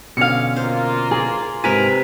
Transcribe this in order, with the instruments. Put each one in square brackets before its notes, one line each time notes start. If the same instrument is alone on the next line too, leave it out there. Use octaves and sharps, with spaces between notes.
[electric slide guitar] B2 D3 C#4 [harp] F5 C#7
[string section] A#3 F4 [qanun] C5
[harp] G#4
[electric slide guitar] G#2 A#4 G#5 [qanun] C3 B4 [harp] B6